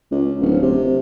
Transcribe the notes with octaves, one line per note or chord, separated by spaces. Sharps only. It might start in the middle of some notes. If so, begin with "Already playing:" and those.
C#2
D1
C3